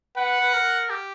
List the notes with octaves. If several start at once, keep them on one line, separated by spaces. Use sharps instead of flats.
B4 F#5
B4
A#4
G4